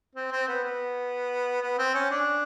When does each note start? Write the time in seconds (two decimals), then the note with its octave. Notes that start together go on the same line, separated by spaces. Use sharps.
0.15 C4
0.32 C4
0.48 B3
0.64 B3
1.62 B3
1.78 C4
1.94 C#4
2.11 D4